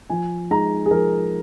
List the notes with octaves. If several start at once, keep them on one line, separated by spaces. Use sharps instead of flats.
F3 G#5
G#3 D#4 A#5
G#4
F3 A#4